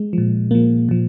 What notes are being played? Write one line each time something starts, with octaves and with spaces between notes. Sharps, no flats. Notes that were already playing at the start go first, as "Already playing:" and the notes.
Already playing: G#3
A#2 F3
A#2 F3 A#3
A#2 F3